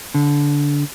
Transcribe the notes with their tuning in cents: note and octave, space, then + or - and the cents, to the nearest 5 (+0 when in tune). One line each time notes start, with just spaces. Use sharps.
D3 -20